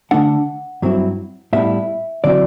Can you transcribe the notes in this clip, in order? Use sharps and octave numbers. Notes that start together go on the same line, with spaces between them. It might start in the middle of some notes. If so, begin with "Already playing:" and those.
D3 A3 D4 F#5
G2 F#3 C4 E4
A2 G3 B3 E4 E5
D3 F#3 C4 E4 D5